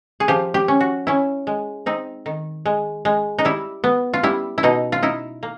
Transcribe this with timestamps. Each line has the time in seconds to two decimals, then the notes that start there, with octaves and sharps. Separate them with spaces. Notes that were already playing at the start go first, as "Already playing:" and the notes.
0.20 G#4
0.28 F3 G4
0.54 G4
0.68 C#4
0.80 F#4
1.07 C#4 E4
1.47 G#3
1.86 C4 D#4
2.26 D#3
2.65 G#3
3.05 G#3
3.38 D#4
3.45 G3 E4
3.84 B3
4.14 F4
4.23 G3 E4
4.58 E4
4.63 B2 D#4
4.92 F4
5.03 D#4 E4
5.43 A#3